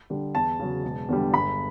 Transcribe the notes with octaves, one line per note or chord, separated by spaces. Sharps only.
D3 G3
E2 A5
C#3 F#3
E1
E2 D3 G3
G1 B5